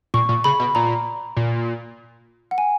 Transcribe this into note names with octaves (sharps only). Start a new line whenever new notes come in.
A#2 C#6
A#2
C#3 B5
B2
A#2 A#5
A#2
F#5
G#5